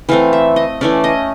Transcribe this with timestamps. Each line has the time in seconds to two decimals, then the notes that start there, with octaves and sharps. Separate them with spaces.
0.09 E3 A3 C4 F5
0.33 E5
0.56 D#5
0.81 E3 A3 C#4 D5
1.04 D#5